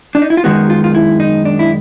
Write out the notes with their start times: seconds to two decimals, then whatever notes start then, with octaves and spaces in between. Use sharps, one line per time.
0.15 D4
0.22 D#4
0.30 E4
0.37 F4
0.44 F#2 D#3 G#3 B3 F#4
0.70 F4
0.84 F4
0.95 E4
1.20 D#4
1.45 D4
1.59 E4